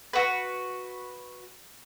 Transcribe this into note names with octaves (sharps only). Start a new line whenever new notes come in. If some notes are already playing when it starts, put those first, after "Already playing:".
F#4 B4